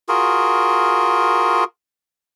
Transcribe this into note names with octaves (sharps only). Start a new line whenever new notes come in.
F4 F#4 G#4 A#4